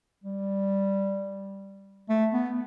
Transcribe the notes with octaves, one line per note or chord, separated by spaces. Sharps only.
G3
A3
B3